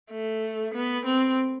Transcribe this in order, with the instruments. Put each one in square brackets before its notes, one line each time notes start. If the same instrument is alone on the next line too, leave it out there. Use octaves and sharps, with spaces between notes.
[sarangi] A3
B3
C4